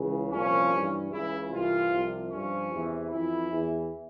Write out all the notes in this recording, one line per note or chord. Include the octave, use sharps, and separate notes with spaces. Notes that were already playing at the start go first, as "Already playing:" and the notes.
Already playing: C#2 C#3 E3
C2 A#2 F3 C#4
G2 E3
C#2 C#3 E3 E4
C2 C3 E3 F4
C2 C3 F3
G2 F3 C#4
E2 C3 E3
F2 E3 E4
E2 E3